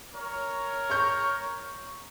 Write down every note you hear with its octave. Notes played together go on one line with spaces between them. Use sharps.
A#4 C#5
A#5 C#6 G6